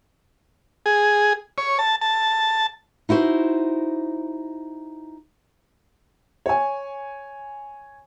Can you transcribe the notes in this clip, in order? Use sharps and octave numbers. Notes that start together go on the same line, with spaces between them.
G#4
C#5
A5
A5
D#4 E4 F#4 C5
C#5 G#5